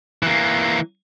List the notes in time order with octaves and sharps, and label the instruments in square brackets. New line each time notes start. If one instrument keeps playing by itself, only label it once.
[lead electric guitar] E3 A#3